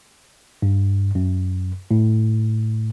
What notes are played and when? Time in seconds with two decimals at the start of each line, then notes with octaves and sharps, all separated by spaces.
0.62 G2
1.15 F#2
1.91 A2